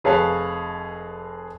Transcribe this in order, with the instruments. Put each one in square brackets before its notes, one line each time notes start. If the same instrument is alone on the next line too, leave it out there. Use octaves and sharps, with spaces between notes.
[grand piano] F1 G#4 B4 C#5 F5 A5